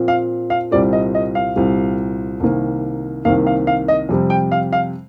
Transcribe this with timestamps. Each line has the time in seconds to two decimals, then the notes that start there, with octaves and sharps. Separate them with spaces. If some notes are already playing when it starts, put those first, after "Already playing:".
Already playing: A#2 F3 C4
0.08 F5
0.50 F5
0.71 C2 A#2 G3 C4 D5
0.93 D#5
1.15 D#5
1.35 F5
1.56 C2 A#2 G3 C4
2.40 C2 C3 D#3 A#3
3.25 C2 C3 D#3 A#3 F5
3.47 F5
3.67 F5
3.88 D#5
4.09 F2 C3 G3
4.30 G5
4.52 F5
4.73 F5